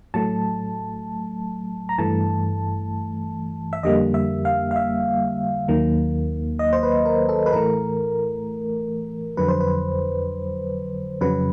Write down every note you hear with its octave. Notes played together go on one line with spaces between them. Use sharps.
A2 F#3 A3 A5
A#5
G2 E3 A3 A5
E5
F2 D3 G3 A#3 D#5
E5
F5
F5
E5
D#2 D#3 F#3 A#3
D#5
C5
B4
A#4
A4
B4
A2 E3 A3 A#4
F2 D3 F#3 B4
C5
B4
F2 C#3 F#3 B4